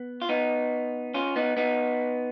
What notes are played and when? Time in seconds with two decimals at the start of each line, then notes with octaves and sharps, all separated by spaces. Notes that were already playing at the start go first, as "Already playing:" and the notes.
Already playing: B3
0.22 F4
0.29 B3 D#4
1.14 C#4 F4
1.36 B3 D#4
1.57 B3 D#4